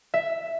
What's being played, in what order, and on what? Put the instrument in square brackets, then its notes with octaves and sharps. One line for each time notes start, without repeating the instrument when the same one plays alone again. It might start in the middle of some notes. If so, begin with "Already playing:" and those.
[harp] E5